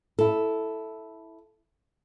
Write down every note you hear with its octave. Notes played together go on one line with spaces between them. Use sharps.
E4 A4